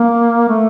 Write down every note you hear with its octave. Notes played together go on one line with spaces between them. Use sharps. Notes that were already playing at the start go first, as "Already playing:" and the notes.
Already playing: A#3
A3